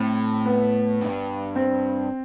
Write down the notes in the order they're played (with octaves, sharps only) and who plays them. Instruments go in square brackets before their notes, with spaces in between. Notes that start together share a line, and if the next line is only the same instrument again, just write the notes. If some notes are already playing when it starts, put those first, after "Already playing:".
Already playing: [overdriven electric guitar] A2 [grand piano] C4
[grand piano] B3
[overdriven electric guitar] G2
[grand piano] C4